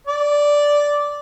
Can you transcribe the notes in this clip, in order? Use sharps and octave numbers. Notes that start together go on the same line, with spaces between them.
D5